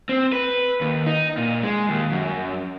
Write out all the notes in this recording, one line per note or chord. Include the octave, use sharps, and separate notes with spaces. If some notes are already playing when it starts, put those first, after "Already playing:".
C4
B4
D#2
D#4
A#2
G#3
D#2
F#2